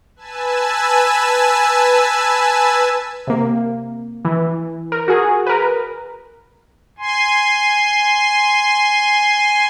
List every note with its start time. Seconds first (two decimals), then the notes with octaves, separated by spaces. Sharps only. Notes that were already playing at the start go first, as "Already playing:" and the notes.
0.16 B4 G#5 A5 E6
3.27 C3 A#3
4.25 E3
4.92 A#4
5.08 F#4 G#4
5.47 A#4 B4
6.99 G#5 C6